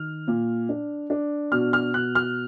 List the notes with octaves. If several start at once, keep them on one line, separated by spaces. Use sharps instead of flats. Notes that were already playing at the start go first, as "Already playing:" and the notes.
Already playing: D#3 F6
A#2
D4
D4
B2 F6
F6
B2 F#6
F6